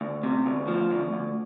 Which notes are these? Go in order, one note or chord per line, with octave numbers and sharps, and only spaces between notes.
D2
C3
D2
F3
D2
D2